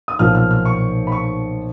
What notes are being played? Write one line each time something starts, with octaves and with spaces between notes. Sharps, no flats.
D#6
B1 A#2 F3 F6
F6
F6
C#6
B5
C#6